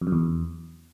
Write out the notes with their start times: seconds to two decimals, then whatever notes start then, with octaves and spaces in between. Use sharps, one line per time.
0.01 F2
0.07 F#2
0.12 E2